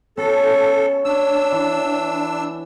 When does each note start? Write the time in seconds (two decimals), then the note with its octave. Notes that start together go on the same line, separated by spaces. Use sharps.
0.17 B3 C#4 F#4 A4
1.05 C#4 D4 E6
1.52 E3